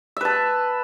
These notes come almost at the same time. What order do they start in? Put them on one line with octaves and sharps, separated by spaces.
E5 B4 A5